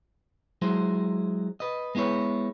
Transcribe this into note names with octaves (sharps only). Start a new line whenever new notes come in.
F#3 G#3 E4 C5
B4 D#5
G#3 B3 E4 B4 C#5